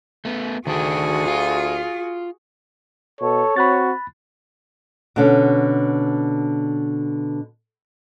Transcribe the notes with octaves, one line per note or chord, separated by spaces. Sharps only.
A3 B3
D2 D#3 D4 F#4 G#4 G5
F4 F5
B2 A4 C#5
C4 F#4 B5 F#6 A6
B2 D3 C#4